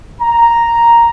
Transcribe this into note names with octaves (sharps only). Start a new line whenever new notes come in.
A#5